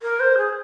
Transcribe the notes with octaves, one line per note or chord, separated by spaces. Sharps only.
A#4
C5
G#4